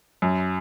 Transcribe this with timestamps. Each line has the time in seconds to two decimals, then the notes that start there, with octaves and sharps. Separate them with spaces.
0.22 F#2